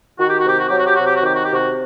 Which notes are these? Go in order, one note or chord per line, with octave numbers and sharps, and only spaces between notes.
D#3 F#4
G4
F#4
C3 G4
F#4
F#3 G4
F#4
G4
C3 F#4
G4
F#4
D#3 G4
F#4
G4
C3 F#4